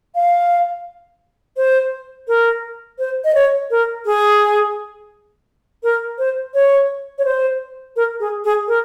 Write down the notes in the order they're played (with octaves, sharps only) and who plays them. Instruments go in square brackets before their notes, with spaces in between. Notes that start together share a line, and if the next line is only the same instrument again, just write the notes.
[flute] F5
C5
A#4
C5
D#5
C#5
A#4
G#4
A#4
C5
C#5
C#5
C5
A#4
G#4
G#4
A#4